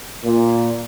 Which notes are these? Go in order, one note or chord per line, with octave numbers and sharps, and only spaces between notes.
A#2